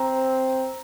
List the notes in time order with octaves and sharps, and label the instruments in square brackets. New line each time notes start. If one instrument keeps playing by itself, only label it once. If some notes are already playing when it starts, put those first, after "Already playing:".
Already playing: [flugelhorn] C4 [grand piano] A#5